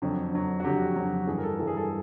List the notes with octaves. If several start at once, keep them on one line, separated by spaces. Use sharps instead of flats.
F2 D3 F#3
F2 D3 F#3
F#4
F2 D3 F#3 G4
F2 D3 F#3
G2 E3 G#4
A#4
A4
G2 E3 A4
G#4
A4